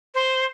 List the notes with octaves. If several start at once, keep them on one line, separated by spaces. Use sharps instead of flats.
C5